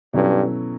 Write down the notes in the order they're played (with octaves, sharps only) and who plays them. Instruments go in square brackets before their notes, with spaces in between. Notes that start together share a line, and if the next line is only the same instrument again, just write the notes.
[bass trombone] G2 [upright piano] B2 F#3 C#4 E4 A4